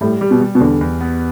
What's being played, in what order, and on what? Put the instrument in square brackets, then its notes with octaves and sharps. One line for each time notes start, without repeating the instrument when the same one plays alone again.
[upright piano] A2 [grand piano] G3
[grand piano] G3
[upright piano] B2
[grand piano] G3
[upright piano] B2
[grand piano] E2 [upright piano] D3
[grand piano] E2
B3